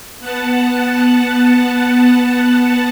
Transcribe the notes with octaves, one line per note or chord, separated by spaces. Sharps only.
B3 F#5 A5